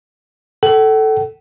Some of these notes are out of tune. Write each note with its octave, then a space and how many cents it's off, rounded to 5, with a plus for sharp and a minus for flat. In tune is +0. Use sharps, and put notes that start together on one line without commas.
A4 +0 F#5 +45